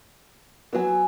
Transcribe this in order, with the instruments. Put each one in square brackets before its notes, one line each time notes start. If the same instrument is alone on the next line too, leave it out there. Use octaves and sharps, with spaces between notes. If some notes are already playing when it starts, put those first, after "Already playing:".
[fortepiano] F#3 B3 [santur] G#5 E6